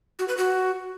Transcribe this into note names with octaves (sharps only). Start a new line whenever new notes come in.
F#4
B4
F#4